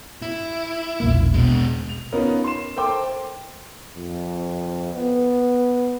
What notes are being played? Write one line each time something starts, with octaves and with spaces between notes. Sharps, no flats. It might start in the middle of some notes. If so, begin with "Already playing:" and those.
E4
E1 A#1 A#3
B2 G#3
F7
B3 C#4 D#4 F4 A#4
C6 E7
A4 A#4 C5 G5 C6 D6
F2
B3